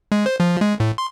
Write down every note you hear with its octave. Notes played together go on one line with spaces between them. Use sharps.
G#3
C5
F3
G#3
A2
C6